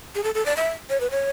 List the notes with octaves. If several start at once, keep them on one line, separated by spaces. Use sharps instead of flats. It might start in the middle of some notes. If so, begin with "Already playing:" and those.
G#4
A4
A4
D5
E5
C#5
B4
C#5